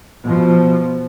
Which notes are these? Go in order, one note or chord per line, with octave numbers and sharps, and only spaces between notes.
B2 F3